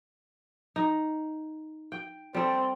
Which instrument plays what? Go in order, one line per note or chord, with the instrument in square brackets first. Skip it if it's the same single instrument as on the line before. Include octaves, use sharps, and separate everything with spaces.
[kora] D#4
G5
[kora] G3 A4 [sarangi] C4